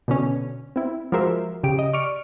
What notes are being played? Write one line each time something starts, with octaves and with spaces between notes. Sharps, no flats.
B2 D3 C#4
C4 E4
F3 G#3 F#4 A#4 C5 E5
C#3 G4 D7
D#5
D5 C#6 F6 C#7 D7